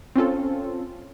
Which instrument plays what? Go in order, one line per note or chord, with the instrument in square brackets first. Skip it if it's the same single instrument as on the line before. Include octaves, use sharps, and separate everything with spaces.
[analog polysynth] C4 C#4 F4 A4